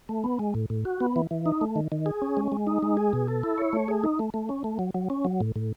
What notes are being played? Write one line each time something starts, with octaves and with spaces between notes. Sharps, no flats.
A3
B3
G#3
A2
A2
F#4
B3
E3
E3
D#4
A3
D#3
D#3
G#4
C#4
G#3
G#3
D#4
G#3
G#4
B2
A4
E4
C#5
A3
G#4
D#4
A3
A3
C#4
A3
F#3
F#3
C#4
F#3
A2
A2